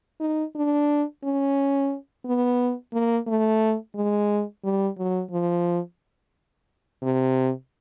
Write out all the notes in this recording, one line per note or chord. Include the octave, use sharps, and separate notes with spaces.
D#4
D4
C#4
B3
A#3
A3
G#3
G3
F#3
F3
C3